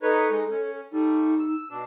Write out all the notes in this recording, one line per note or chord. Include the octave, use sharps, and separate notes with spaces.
D#4 A4 B4 C#5
G#3 D#4
C#4
G3 A3 D#4
E6
B2 D4